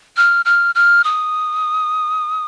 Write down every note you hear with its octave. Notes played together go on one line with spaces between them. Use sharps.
F6
F6
F6
D#6